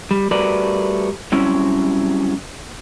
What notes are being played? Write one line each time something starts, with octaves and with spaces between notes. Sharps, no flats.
G3
G3 A3 F#4 A#4 B4 D5
F#3 G3 C4 C#4 E4